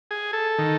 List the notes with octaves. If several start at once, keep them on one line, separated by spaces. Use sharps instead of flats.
G#4
A4
D#3